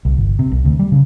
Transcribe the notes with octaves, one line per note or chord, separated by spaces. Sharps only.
C2
G1
C3
C2
D2
G3
C#3